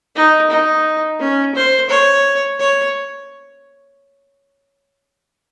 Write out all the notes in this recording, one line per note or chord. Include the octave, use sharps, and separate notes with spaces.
D#4
D#4
C#4
C5
C#5
C#5